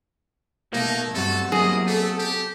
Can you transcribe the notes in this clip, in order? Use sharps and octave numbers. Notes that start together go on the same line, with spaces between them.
B2 A3 A#3 D#4
B1 G2 C3 F#4 A4
F#3 A#3 E4 G#4 D#5
A3 A4
G4